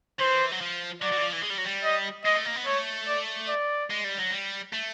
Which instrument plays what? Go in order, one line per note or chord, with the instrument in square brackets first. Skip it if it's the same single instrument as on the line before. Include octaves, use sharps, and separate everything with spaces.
[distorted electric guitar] E3 [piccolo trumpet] C5
[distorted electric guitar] F#3
F3
[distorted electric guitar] F#3 [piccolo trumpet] D5
[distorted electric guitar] F#3
E3
F3
E3
G#3
G3
F#3
G3
[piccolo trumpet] D#5
[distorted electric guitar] G#3 [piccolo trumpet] D#5
[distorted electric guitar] A3
A#3
B3
[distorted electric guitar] A3 [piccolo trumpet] C#5
[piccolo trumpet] D5
D5
[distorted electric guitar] G#3
G3
F#3
G3
A3